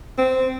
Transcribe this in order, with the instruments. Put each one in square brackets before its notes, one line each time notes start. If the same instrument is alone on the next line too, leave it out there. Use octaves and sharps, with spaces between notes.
[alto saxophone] C4